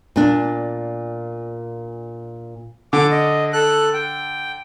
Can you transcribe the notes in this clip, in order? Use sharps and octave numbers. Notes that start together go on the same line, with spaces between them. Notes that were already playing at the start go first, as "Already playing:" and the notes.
A#2 D4
D3 D6
D#5
A4 F#6
G5